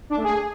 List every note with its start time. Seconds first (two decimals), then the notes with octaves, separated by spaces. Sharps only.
0.10 D4
0.17 A3
0.24 G#4